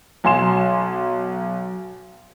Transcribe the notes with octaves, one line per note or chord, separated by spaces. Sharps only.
B1 G#5 C6 E7